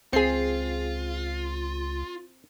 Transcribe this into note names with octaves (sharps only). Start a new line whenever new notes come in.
C#2 C4 F4 G#4 C7